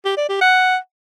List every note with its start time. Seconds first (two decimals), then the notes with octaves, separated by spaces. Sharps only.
0.05 G4
0.17 D5
0.29 G4
0.41 F#5